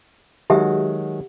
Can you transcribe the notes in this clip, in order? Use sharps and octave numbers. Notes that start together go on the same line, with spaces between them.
D#3 F#3 G#3 G4 E5 F#5